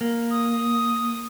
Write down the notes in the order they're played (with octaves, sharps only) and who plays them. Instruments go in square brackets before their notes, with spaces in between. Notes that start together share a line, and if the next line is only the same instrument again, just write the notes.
[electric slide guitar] A#3
[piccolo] D#6